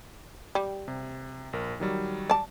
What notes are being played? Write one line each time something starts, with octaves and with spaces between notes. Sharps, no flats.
G3
C3
A#1 A#4
D#3 F#3 G3
D5 A5